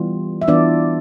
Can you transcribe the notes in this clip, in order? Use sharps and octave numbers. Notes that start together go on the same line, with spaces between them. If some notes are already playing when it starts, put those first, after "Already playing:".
Already playing: E3 G3 B3 F4
E5
E3 B3 D4 F4 D5